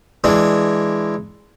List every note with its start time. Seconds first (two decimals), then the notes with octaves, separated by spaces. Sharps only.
0.24 E3 G#3 D4